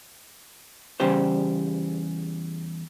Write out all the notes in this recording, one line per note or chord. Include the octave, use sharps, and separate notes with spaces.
E2 C#3 G3 G4 C5